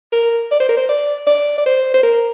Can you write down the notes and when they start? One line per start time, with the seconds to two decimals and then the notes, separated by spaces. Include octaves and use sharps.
0.12 A#4
0.51 D5
0.60 C5
0.69 A#4
0.77 C5
0.89 D5
1.27 D5
1.58 D5
1.66 C5
1.94 C5
2.03 A#4